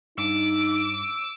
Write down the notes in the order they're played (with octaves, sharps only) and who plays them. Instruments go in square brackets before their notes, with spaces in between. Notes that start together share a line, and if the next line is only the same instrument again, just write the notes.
[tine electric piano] G2 [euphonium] D#4 [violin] D6 [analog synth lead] E6